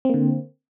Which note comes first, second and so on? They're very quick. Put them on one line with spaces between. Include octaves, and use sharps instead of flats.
C4 A#3 D3